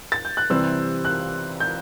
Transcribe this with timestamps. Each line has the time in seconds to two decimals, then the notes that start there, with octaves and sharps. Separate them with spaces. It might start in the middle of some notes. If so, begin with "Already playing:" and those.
0.12 A6
0.25 G6
0.37 F#6
0.50 C3 E3 G3 C4 E6
1.05 F#6
1.60 G6